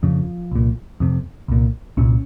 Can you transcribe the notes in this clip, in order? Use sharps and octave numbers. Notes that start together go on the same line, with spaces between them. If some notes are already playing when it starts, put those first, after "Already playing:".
F2 C#3 F3
C2 A#2
F2 C3
C2 A#2
C2 A#2 C#4